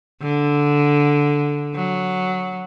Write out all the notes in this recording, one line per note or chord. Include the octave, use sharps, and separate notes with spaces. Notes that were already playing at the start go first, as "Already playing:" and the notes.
D3
F#3